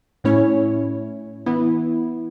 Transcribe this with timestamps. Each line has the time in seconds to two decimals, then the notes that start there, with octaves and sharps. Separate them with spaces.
0.24 A2 A3 C#4 E4 C#5
1.46 E3 B3 E4